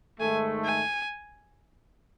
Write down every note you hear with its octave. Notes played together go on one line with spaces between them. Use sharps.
G#2 D#3 A3 G#5
G#5